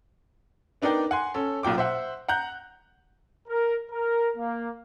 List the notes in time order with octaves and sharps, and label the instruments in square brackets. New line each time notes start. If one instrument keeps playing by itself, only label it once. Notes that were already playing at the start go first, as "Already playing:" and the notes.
[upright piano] B3 D4 D#4 A#4 D5 G5
F#5 G#5 C6
C#4 A4
B1 A#2 G5 D6
C5 E5 F#5
F#5 A#5 F#6 G6
[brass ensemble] A#4
A#4
A#3